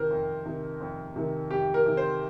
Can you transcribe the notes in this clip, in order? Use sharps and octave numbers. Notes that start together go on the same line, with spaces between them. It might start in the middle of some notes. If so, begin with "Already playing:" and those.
Already playing: F2 C3 D#3 A#4 C5
F2
C3 D#3
F2
C3 D#3
F2 G4
A#4
C3 D#3
C5